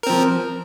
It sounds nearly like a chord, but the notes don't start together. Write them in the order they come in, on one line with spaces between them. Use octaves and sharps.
A#4 C4 F3